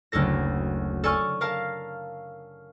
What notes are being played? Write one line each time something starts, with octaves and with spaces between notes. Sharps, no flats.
F#1 D2 E4 A4 A#6
A4 D5 G#5 C#6 F6
A#4 F5 A5